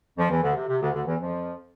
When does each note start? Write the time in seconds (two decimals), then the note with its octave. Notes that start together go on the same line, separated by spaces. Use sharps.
0.17 F2 F3
0.29 E2 E3
0.42 D2 D3
0.54 C3
0.68 C3
0.81 D2 D3
0.93 D2 D3
1.05 E2 E3
1.18 F2 F3